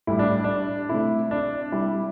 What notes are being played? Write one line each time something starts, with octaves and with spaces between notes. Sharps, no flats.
A2 G3 E4
D4
D4
C3 A3 E4
D4
C3 G3 E4